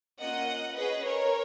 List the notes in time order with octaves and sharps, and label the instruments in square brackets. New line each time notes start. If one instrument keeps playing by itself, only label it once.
[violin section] A#3 C#4 F4 D#5 F#5
C#4 G#4 B4 D#5
A#4 C#5